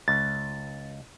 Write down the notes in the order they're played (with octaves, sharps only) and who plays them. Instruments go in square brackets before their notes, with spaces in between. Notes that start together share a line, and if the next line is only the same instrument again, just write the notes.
[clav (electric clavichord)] C#2 [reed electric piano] A6